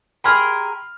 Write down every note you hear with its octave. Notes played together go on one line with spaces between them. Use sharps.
G4 G#4 A#4 B5 C6 F6